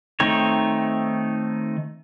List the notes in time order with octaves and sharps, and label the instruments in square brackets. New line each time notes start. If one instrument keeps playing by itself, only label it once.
[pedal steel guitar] D#3 A3 C4 D#4 C#5